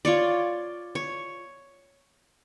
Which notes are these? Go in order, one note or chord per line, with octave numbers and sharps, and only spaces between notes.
F4 C#5 D5
C#5